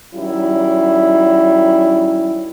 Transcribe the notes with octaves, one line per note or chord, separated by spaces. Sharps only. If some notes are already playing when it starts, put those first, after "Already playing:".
D#3 F#3 G3 C#4 E4